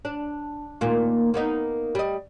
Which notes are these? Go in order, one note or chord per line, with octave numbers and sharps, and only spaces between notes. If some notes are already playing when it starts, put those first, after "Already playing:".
D4
D#2 A#2 A#3
A#3 B3 D#4
G3 D#5